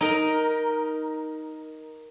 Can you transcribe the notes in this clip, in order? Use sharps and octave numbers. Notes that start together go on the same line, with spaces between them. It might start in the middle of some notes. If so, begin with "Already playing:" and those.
D#4 A#4